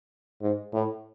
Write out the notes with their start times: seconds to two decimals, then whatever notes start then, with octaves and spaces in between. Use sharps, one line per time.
0.42 G#2
0.73 A2